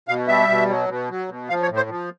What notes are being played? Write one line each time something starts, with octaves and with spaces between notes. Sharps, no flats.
B2 F5
G3 E5
B2
F#3
B2
F#3
B2
F3 F5
C#5
A2
C5
F3